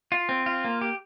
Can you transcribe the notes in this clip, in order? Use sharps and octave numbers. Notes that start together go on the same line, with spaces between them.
F4
C4
F4
A#3
G4